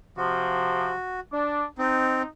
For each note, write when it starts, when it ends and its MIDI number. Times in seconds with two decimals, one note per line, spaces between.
0.17 0.92 48
0.17 0.92 53
0.17 1.20 66
1.33 1.64 62
1.78 2.22 60
1.78 2.26 63